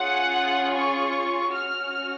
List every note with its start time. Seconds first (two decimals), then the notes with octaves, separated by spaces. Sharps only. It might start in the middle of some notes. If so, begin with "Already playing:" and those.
Already playing: C#4 F4 G#4 F#5
0.72 C#6
1.51 C#4 F#4 F6